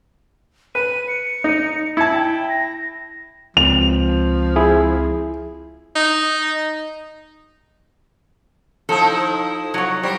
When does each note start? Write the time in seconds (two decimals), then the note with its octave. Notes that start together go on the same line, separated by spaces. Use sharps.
0.75 B4 D#7
1.08 C#7
1.44 D#4
1.97 E4 A5 G#6
2.13 G5
2.50 A#6
3.57 C#2 F3 C4 F7
4.56 E4 G#4
5.96 D#4
8.89 F3 D#4 E4 A4
9.74 F#3 C#5
10.03 G3 A#4 C5